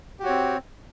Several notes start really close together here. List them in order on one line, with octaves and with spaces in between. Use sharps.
G4 F#4 C#5 C4